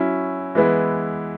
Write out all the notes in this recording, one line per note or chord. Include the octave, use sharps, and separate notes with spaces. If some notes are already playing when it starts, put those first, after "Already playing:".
Already playing: F#3 C#4 E4
E3 G#3 B3 E4